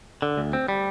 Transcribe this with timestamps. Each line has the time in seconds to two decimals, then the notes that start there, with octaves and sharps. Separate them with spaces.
0.22 D3
0.37 D2
0.53 C4
0.68 G3